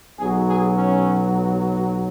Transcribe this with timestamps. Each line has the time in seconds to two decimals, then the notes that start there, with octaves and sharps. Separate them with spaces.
0.20 B1 B2 F#3 G#4
0.49 G#4
0.77 C#4